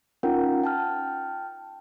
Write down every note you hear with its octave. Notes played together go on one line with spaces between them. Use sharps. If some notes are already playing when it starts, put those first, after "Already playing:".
C#4 D#4 F4 A#4 F#5 G5
G5 A5 F6